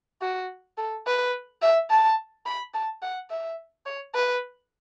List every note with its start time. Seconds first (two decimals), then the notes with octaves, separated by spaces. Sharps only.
0.22 F#4
0.78 A4
1.07 B4
1.62 E5
1.91 A5
2.46 B5
2.74 A5
3.02 F#5
3.30 E5
3.86 C#5
4.15 B4